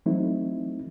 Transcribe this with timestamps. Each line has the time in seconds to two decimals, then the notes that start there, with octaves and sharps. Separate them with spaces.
0.06 E3 F#3 A3 C4 D#4 E4